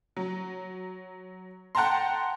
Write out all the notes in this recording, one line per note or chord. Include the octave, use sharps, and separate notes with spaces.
F#3
F#5 G5 A5 A#5 C6